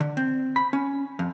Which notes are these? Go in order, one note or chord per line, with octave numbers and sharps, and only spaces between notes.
D3
C4
B5
C#4
F2